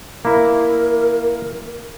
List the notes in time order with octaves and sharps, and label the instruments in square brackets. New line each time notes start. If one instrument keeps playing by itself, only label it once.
[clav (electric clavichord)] A#3 E4 [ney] A#4